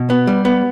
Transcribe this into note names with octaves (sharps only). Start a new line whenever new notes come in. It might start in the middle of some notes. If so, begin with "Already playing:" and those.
Already playing: B2
B3
G3
B3